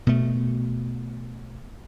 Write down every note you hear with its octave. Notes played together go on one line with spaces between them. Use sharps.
B2 A3